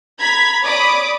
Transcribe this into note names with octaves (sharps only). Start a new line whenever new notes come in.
A#5 B5 G#6 B6
C#5 D5 B5 D6 D#6